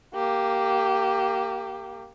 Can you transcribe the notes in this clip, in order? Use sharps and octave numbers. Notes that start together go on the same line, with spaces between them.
A#3 G4